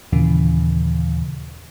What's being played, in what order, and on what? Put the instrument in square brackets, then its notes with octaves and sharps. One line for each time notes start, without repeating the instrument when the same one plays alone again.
[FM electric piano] D#2 A#2 C#3 E3